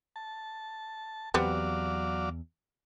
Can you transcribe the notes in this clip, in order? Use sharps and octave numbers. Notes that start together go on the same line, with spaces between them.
A5
E2 F#3 G3 B3 C4 D5 F5